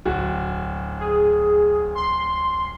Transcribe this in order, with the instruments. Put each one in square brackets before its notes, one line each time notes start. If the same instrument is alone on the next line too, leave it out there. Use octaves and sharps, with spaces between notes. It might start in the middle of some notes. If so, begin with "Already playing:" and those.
[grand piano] D1 F#4
[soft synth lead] G#4
C6